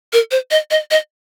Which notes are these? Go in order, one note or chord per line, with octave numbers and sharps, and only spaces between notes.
A#4
C5
D#5
D#5
D#5